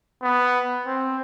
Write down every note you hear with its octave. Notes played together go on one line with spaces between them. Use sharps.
B3
C4